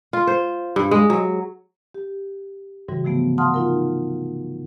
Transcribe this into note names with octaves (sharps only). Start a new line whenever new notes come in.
F4
C5
G2
G#3
F#3
G4
G#2 C#3 E3 G3 F#4
C3 F3 A3 B3
F5 F#5 A5 C6 D#6 F6
D#4 F4 A#4